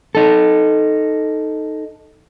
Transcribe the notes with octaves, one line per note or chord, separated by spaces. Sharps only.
D#4 A4